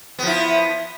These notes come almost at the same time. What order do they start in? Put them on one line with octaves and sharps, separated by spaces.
B3 F3 E4